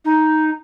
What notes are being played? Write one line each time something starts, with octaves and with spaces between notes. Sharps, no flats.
D#4